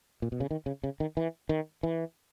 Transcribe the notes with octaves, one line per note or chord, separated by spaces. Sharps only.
A#2
B2
C#3
D#3
C#3
C#3
D#3
E3
D#3
E3